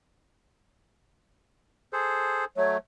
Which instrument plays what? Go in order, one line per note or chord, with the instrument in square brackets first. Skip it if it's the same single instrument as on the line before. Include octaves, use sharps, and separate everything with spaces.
[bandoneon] G#4 A4 C5
[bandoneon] F#3 A3 [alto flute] C#5